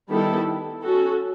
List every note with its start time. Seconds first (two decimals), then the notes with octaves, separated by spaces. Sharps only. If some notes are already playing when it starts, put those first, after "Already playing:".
0.10 D#3 G3 B3 E4 A4
0.84 C#4 F#4 A4